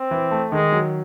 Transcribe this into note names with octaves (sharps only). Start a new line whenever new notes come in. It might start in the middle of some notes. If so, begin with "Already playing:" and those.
Already playing: C4
E3
A3
D#3 G#3
F#3